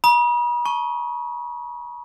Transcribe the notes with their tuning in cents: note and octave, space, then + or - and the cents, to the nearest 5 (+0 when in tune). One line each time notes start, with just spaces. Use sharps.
B5 -45 D#6 +0
A5 -5 C#6 -5